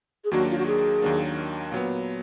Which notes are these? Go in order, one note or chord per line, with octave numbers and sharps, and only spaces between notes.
G#4
D#2 D#3 F#3 A#3 D4 F#4
F4
F#4
G#4
D#2 D#3 F#3 A#3 D4
A#2 F#3 B3